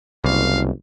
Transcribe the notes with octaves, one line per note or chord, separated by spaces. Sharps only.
F#1 C2 F5